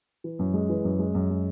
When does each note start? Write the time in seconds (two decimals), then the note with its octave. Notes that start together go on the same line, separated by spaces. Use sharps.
0.24 E3
0.39 F#2
0.54 G#3
0.69 E3
0.84 F#2
0.99 G#3
1.15 F#2
1.30 G#3